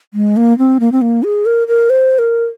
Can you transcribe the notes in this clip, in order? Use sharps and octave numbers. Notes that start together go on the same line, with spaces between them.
G#3
A#3
C4
A#3
C4
A#3
G#4
A#4
A#4
C5
A#4